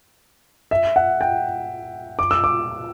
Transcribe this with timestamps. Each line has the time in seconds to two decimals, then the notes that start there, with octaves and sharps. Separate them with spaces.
0.71 E5
0.96 F#5
1.21 G5
2.19 D6
2.31 E6
2.44 D6